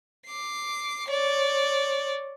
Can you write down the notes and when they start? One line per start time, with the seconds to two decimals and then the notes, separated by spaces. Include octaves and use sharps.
0.27 D6 C7
1.08 C#5 D5